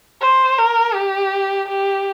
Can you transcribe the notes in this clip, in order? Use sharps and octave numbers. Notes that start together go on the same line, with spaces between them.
C5
A#4
G4
G4